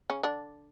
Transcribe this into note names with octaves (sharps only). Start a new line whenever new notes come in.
C#3 C#4
D3 D4